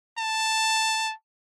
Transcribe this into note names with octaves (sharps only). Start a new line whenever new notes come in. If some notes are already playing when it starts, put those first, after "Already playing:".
A5